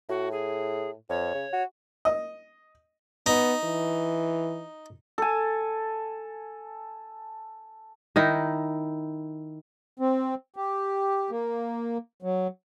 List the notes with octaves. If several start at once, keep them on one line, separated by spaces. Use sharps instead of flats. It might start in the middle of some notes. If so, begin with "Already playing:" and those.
A2 F#4
G#4
F2 C#5
C#3
F#4
D#5
B3 D#4
E3
A4 G#5
D#3 D#4 E4
C4
G4
A#3
F#3